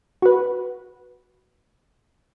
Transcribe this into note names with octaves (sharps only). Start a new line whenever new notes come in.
F#4 B4